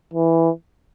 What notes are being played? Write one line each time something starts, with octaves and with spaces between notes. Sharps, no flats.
E3